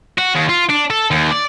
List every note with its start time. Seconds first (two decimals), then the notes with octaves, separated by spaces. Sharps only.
0.18 F#4
0.35 D#2
0.48 F4
0.69 D4
0.90 A4
1.11 D#2
1.31 D5